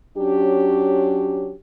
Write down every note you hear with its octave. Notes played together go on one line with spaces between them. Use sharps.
F#3 C#4 D4 G4